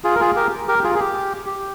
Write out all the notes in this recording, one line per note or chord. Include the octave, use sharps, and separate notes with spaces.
F4 G#4
A#4
F4 G#4
G4 A#4
G4 A#4
G4
F4 G#4
G#4
G4
G4